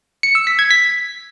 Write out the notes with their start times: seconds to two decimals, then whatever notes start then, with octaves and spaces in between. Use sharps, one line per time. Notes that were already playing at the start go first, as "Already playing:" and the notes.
0.23 C#7
0.35 E6
0.47 B6
0.59 G#6
0.71 B6